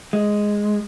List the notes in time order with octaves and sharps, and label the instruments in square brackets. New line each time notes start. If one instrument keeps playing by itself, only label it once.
[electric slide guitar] G#3